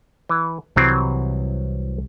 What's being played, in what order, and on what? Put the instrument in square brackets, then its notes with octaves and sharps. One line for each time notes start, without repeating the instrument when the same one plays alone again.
[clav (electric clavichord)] E3
[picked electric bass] C2 C3 [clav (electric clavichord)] E3 F#3 C4